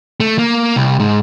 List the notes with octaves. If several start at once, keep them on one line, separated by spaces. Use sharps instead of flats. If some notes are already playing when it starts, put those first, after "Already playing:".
A3
A#3
C2
G#2